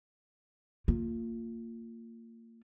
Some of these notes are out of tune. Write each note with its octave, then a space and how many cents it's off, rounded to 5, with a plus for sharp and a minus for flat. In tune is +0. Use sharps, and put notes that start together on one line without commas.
A#3 -30 F4 +0